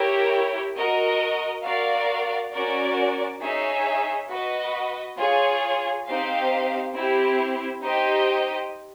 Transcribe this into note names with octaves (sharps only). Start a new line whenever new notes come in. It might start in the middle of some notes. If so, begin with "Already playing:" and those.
Already playing: E4 G4 A#4 C#5
F#4 A#4 D#5
F#4 A#4 D5 F5
C#4 F#4 A#4 D5
D#4 G#4 C#5 E5
F#4 B4 D#5
F4 G#4 C#5
C4 D#4 G4 C5 F5
C4 E4 G4
D#4 G4 C5 D#5 G5